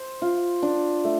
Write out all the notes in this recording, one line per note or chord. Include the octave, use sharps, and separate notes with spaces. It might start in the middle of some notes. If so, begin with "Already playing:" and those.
Already playing: C5
F4
D4
A3